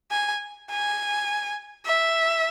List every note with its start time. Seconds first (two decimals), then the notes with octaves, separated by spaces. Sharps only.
0.11 G#5
0.71 G#5
1.87 E5